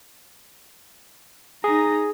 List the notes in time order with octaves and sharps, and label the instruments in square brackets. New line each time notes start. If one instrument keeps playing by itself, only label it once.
[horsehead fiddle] D#4 A#5 [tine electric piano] G#4